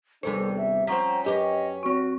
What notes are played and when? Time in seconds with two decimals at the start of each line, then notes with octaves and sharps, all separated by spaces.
0.23 D#2 C3 G3 B3 D4 A4 C5
0.57 E5
0.87 F3 C4 C#4 F#5 A#5 C#6 B6
1.24 F#2 G4 B4 D#5
1.83 C4 F#4 C#6